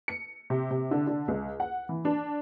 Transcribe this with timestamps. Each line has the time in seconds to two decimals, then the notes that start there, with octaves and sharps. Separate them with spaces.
0.08 C#7
0.50 C3
0.71 C3
0.91 D3
1.07 D3
1.28 C#2
1.60 F#5
1.89 E3
2.05 D4